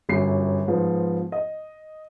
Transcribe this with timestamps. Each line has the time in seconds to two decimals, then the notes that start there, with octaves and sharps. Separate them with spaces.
0.09 G1 F#2 C7
0.68 G#2 F3 B3
1.32 D#5